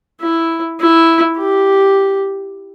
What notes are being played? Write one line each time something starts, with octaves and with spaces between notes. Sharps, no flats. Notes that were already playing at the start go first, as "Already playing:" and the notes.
E4
E4
G4